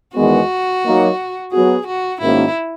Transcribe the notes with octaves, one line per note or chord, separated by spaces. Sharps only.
E2 D#3 G#3 B3 F#4
F#3 A#3 D#4
F#3 B3 F#4 G#4
F#4
G#2 D#3 A#3 C#4 E4 F#4